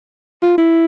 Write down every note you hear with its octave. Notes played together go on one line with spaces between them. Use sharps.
F4
E4